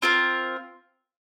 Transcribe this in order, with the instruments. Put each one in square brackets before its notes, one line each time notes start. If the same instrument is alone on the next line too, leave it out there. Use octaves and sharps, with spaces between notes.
[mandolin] C4 F4 A#4